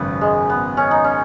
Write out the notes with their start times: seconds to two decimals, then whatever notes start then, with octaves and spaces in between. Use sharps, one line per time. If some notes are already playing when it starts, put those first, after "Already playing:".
Already playing: G#1 F#2 C#3 B3
0.21 G#3
0.49 B3
0.77 C#4
0.91 D#4
1.04 C#4